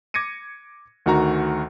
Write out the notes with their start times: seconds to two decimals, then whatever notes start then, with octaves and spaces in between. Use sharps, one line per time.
0.14 D6 G#6 A#6 C#7 D#7
1.06 D2 D#3 F#4 A#5